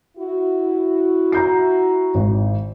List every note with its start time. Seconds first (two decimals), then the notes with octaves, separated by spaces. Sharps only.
0.17 E4 F#4
1.32 A#5 G6 C7
2.15 G#1